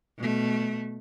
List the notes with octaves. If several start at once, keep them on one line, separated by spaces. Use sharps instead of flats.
B2 A3